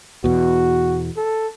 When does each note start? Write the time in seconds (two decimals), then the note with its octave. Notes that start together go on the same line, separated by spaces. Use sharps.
0.24 E2 B2 F#4
1.17 A4